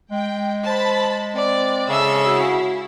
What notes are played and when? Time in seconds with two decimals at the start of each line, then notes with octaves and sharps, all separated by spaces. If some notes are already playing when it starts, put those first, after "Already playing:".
0.11 G#3 G5
0.66 C5 A5 B5
1.35 C4 D5
1.89 C#3 A4 E5 E6
2.26 E4 F#4